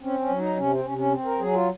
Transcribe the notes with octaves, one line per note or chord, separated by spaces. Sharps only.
C4 C#4
C#4
F#3
D#4
C3 C#4
C4
C3 C#4
C#4
C4
A#4
F#3 G#4
F4